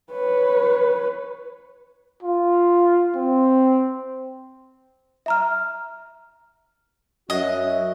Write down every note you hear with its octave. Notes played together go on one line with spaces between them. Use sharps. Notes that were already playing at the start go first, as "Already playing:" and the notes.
B4 C#5
F4
C4
E5 A#5 F6
F#2 F#4 D#5 E5